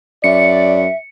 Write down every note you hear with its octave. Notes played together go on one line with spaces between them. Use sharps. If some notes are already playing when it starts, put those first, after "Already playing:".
F#2 D5 E5 C#7